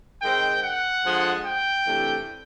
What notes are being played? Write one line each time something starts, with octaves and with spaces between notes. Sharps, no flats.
D#3 G#3 C4 G5
F#5
D3 F3 G#3
G5
C3 E3 A3 D4